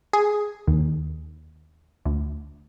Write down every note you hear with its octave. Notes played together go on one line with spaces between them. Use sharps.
G#4
D#2
D2